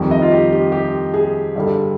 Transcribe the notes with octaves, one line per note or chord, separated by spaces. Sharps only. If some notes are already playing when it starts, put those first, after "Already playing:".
Already playing: F2 D#3 G3
D#5
F4
G4
G4
G4
G#4
G2 D3 G3